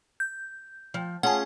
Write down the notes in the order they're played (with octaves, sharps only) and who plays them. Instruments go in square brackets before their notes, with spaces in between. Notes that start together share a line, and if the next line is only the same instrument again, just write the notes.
[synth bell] G6
[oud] F3
[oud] C#4 F4 G#4 [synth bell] F#5 A5